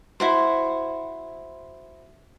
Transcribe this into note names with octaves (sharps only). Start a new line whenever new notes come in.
E4 F#4 C5